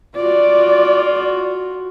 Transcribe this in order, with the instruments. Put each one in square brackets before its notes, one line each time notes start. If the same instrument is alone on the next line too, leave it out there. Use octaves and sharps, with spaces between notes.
[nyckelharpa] F4 F#4 [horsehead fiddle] D5